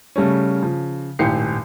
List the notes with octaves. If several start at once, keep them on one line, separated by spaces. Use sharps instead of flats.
C#3 G3 A3 C#4
C#3 F3
D#1 G#1 A2 G4 C7 C#7